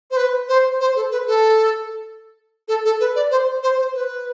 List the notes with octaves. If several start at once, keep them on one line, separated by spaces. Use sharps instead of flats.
C5
B4
C5
C5
A4
B4
A4
A4
A4
B4
D5
C5
C5
C5
B4